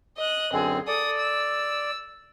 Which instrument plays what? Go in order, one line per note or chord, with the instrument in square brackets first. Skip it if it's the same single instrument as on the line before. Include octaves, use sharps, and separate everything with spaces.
[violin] D#5 F#6
[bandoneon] F#2 D3 C4 [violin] G#4
[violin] A4 D#6 [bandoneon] D5
[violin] E6